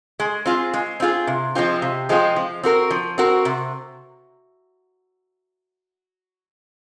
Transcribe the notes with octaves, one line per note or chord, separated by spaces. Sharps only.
G#3
C4 F4 G#4
G#3
C4 F4 G#4
C3
F3 G#3 C4 F4
C3
F3 G#3 C4 F4
F3
C4 F#4 A#4
F3
C4 F#4 A#4
C3